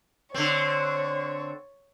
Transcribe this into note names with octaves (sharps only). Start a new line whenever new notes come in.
D3 C4 C#5